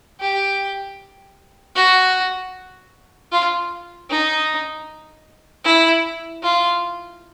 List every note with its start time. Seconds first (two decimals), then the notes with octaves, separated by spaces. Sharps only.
0.21 G4
1.76 F#4
3.32 F4
4.10 D#4
5.65 E4
6.43 F4